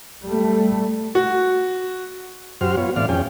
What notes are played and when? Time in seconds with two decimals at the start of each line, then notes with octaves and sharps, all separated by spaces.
0.25 G3 A3
1.15 F#4
2.61 F#2 F#4 G4 C5 F6
2.77 B3 F4 C#5
2.96 A2 E3 C4 D5 F5 F6
3.09 F2 C#4 G#4 G5